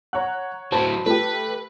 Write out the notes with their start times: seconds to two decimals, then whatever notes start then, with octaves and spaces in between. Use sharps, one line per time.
0.13 C#5 F#5 A#5 F#6
0.72 A2 F#3 C5 A5 B5
1.06 A3 G4 B4